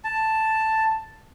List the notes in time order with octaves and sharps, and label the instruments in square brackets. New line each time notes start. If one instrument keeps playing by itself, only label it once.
[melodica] A5